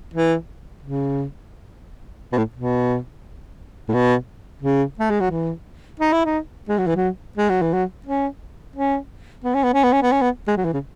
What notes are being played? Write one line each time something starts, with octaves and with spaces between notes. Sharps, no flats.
E3
C#3
B2
A2
B2
A2
B2
C#3
A3
G#3
F#3
E3
D#4
E4
D#4
G#3
F#3
E3
F#3
G#3
F#3
E3
F#3
C#4
C#4
B3
C#4
B3
C#4
B3
C#4
B3
C#4
B3
G#3
F#3
E3
C#3